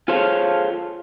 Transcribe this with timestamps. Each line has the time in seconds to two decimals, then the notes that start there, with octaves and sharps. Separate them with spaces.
0.08 F4 G#4 A4 C5 C#5 F5